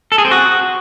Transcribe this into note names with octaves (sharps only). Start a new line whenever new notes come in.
A4
G#4
C4
F#4